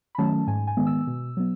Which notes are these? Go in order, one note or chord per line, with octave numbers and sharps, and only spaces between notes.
B5
D#3 F#3 A3 C#4 A5
G#2 G#5
G#5
D#3 G#3 B3
E6
B2
F#3 B3